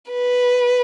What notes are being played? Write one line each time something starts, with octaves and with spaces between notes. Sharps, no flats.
B4